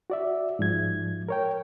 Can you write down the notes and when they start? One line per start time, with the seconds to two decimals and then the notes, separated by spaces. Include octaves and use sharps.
0.10 F#4 D5 E5
0.59 G#2 F3 G#6
1.29 A#4 C#5 G5